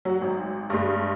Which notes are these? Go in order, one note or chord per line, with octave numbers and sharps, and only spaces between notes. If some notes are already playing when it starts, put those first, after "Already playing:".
F#3 F#4
G#1
G2 G#3